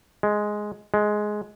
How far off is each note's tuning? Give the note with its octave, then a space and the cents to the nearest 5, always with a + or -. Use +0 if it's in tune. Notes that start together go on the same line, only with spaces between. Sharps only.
G#3 +5
G#3 +10